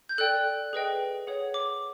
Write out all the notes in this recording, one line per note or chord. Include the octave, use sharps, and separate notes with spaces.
G6
A4 D5 G5 F#6
G#4 B4 D#5 G5
G#4 C#5 F#5
D6